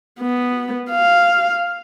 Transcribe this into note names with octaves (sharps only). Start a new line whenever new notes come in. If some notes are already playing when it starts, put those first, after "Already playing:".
B3
F5